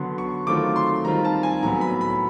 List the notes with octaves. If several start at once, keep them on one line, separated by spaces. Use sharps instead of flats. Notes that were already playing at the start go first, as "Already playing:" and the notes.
Already playing: D3 F#3 B3 C6
C#6
D#3 F#3 A3 C4 F4 D6
C6
D#3 G3 C4 F4 A#5
A5
G#5
A2 F#3 B3 A#5
B5
B5